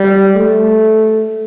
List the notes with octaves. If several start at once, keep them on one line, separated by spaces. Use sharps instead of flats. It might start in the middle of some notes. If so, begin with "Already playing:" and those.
Already playing: G3
A3